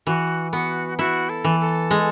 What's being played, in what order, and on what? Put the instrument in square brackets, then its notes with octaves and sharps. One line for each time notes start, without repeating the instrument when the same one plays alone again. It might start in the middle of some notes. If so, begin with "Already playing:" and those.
[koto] E3 [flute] F#4
[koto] B3 [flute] F#4
[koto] E4 [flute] F#4
[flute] A4
[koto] E3
[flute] A4
[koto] G#3